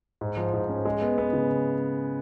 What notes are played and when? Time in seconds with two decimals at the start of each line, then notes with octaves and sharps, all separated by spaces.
0.21 G#2
0.37 F3
0.53 G#2
0.69 C#4
0.85 G#3
1.02 B3
1.18 B3
1.33 C#3